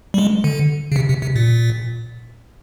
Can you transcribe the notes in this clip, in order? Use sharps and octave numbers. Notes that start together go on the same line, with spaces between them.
G3
G#3
D3
C#3
C3
C3
C3
A#2